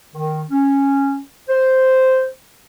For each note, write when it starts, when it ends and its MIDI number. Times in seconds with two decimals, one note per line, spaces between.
0.15 0.41 51
0.50 1.17 61
1.48 2.27 72